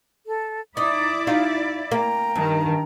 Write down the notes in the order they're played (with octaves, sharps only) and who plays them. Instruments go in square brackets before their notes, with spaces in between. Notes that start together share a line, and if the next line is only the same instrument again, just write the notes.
[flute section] A4
[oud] D#4 [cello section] E4 D5 [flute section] D6 D#6
[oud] D#4 F4 F#4 [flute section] F5
[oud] A#3 [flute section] G5 A#5
[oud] G2 [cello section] D#3